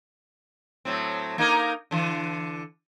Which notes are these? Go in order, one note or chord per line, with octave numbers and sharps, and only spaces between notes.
A2 F#3 C4
A#3 D#4 A#4
D3 E3